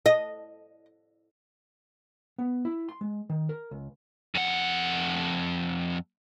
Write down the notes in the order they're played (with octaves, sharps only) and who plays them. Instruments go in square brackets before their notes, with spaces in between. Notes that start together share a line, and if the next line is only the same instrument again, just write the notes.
[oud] D#5
[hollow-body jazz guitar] B3
E4
C6
G#3
D#3
A#4
C#2
[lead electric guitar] F2 F#5